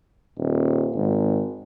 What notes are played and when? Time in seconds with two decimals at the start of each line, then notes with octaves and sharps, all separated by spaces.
0.38 D#1
0.95 G#1